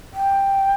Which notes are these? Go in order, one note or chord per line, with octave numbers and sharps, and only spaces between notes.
G5